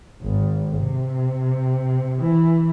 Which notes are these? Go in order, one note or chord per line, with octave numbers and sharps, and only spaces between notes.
G#1
C3
E3